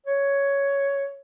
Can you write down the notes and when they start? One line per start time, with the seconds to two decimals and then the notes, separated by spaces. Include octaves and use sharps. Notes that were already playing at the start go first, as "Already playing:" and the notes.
0.06 C#5